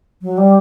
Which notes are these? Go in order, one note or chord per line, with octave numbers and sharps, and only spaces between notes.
F#3
G3